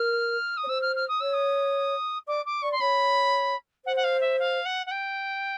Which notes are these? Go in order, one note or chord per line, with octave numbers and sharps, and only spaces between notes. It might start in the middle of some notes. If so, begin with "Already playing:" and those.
Already playing: A#4 F6
D#6
C#5
C5 E6
F6
F6
D#6
C#5 E6
D#6
D5 D6
D6
D5 C#6
C6
C#5 B5
C5 F#5
F#5
F5
E5
F5
F#5
F#5
G5